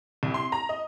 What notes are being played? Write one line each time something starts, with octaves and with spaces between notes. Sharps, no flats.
C2
C6
A#5
D#5